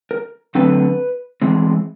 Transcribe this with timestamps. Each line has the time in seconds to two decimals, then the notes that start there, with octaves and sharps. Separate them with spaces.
0.11 A#4
0.55 D3 F#3 A3 C4 B4
1.42 E3 G#3 C4